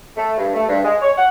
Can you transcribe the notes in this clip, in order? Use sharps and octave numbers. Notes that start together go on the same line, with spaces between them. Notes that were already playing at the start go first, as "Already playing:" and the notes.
A3
G2
A3
G2
G#3
C#5
F#5